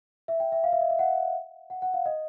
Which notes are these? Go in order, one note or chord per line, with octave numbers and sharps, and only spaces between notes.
E5
G5
E5
F5
E5
D#5
E5
F#5
F#5
F#5
F5
D#5